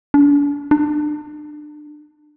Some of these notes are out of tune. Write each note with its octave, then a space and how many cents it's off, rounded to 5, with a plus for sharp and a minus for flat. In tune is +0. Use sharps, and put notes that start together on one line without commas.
D4 -40
D4 +30